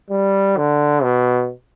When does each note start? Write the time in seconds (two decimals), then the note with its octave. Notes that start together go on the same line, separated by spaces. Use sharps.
0.10 G3
0.57 D3
1.03 B2